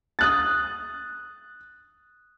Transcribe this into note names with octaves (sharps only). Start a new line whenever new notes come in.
D#6 F#6 A6